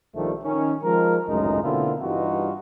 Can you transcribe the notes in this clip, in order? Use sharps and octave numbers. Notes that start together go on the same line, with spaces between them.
A#1 D#3 F3 G3 A3
D#3 C#4
F3 G#3 A#4
G#1 C#2 F#2 A2 G#3 D#4
B2 D3 A#3 C4 E4 F4
G2 E3 G3 D#4 F4 F#4